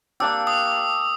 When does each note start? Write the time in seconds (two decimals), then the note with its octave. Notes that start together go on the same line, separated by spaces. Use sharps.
0.20 A#3 D4 G4 E6
0.47 D#6